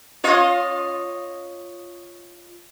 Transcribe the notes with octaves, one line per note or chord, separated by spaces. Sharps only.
F4 C#5 D#5